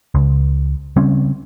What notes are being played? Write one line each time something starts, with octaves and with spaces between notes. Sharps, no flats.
C#2
C#3 G3 C4 C#4